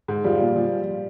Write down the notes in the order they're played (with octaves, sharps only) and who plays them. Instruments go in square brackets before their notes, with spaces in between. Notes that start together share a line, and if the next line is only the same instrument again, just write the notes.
[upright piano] G#2
F3 G3
A#2
F3